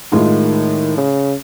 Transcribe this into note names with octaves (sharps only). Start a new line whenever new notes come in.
A2 D#3 G#3 F4
C#3